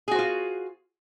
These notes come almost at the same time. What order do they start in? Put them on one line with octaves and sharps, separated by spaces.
G#4 F#4 C5 F4